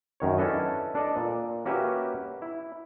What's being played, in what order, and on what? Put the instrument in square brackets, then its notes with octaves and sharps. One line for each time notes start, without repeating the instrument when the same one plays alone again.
[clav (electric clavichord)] F#2 D#3 C#5
C#4 D4 E4 A4 B4 D#5
D4 A4 D5 D#5
A#2
A#3 C#4 F#4 G4 B4 E5
E4